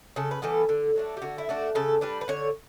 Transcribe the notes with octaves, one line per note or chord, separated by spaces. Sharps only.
C#3 A4
B4
E3 G3 B3 A4
D3
F#3 A3 D4
G4
D3 F#4
E4
A3 D4 F#4
C#3 A4
G3 D4 B4
B4
D3 C#5